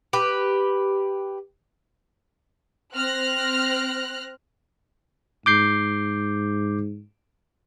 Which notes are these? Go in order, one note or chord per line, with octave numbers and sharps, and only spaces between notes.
G4 B4
C4 F6 F#6 A#6
G#2 D6 G6 C7